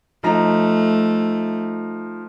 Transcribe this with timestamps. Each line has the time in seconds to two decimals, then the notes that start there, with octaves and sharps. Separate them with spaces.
0.23 F3 A3 D#4 A#5